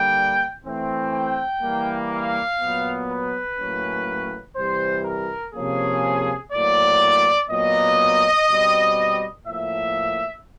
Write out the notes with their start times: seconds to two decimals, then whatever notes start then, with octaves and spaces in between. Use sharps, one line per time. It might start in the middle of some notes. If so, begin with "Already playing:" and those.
Already playing: D3 G3 A#3 G5
0.65 E3 A3 C4
1.13 G5
1.62 E3 G3 A#3
2.11 F5
2.61 A#2 F#3 B3
3.09 B4
3.58 A2 F#3 A#3 C#4
4.56 C3 E3 G3 C5
5.05 A#4
5.54 C3 F3 A#3 C#4 G#4
6.53 A2 F#3 A#3 D5
7.50 A#2 F#3 B3 D#5
8.49 B2 G3 C4
9.47 A2 F3 A#3 E5